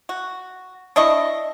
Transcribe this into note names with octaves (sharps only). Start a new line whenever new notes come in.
F#4
D4 E4 D#5 C#6